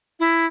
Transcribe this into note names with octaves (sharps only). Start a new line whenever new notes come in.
E4